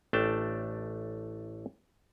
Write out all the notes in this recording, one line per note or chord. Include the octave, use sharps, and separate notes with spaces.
A1 A3 D4 G5 A5